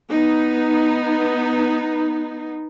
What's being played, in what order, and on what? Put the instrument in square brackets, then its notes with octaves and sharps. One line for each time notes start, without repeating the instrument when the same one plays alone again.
[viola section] B3 D#4